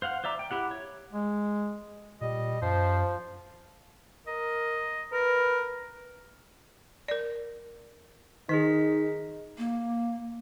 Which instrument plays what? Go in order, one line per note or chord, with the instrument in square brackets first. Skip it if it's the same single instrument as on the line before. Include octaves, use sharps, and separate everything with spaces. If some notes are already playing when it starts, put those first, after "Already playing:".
[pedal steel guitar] C5 F5 F#5
C5 D5 E5 A#5 D6
G5
E4 G4 F#5
C#5
[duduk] G#3
[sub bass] A#2 [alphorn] G3 [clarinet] D#5
[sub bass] F#2 [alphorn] F3 [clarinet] C5
[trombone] A#4 [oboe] D#5
[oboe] A#4 [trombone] B4
[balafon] A#4 D5
[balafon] D#3 [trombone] D#4 [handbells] G#4 A#4 B6
[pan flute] A#3